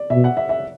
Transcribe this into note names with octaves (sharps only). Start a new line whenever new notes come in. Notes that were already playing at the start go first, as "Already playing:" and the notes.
Already playing: D5
B2 E5
F#5
E5
E5